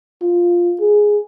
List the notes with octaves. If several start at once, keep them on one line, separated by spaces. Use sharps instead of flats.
F4
G#4